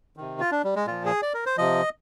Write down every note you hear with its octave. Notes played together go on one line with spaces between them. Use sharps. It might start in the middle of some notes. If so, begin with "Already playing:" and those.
C3 D#3
F4
D4
G3
G#3
A#2 F3 F4
G#4
D5
A#4
C5
C3 F3 D#5